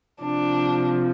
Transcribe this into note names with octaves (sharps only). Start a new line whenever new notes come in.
C3 F3 D4